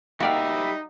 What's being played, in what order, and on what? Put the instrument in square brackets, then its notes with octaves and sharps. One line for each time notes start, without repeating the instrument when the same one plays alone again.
[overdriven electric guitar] G3 E5 [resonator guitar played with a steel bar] A#3 G5 [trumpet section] D#4 [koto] F#4 D5 F5